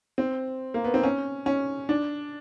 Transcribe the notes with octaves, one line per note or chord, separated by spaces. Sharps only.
C4
A#3
B3
C4
C#4
C#4
D4